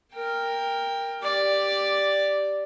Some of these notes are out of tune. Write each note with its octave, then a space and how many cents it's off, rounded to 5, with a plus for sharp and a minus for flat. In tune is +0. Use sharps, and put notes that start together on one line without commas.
A#4 +0 G5 +20
G4 +0 D5 +0